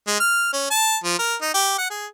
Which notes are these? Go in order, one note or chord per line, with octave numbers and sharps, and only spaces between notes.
G#3
F6
C#4
A5
F3
A#4
D#4
G4
F#5
G#4